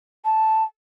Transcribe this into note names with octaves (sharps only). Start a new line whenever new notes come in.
A5